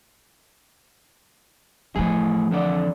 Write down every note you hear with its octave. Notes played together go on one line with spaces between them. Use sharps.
A2 E3 F3 G#4
F2 D3 D5